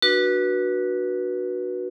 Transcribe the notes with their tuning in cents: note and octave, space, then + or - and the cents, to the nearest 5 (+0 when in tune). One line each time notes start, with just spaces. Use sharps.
D4 +25 F#4 +0 B4 -25